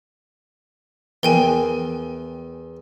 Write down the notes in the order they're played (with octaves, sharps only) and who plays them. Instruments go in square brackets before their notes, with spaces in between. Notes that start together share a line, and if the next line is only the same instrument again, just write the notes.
[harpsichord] E2 [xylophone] A#4 G5 G#5